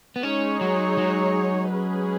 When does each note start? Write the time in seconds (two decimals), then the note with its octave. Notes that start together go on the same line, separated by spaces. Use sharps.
0.16 B3
0.23 G#3 C#4 D#4 G#4 C#5
0.61 F#3
0.98 F#3
1.72 G#3 C#4 G#4 B4